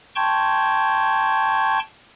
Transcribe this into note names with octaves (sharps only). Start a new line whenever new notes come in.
G5 A5 C6 C#6 G6 G#6